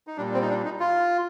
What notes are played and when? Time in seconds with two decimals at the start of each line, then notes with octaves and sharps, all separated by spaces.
0.07 D#4
0.17 A#2 G3 D4
0.34 C4
0.42 D#4
0.49 D4
0.65 D#4
0.80 F4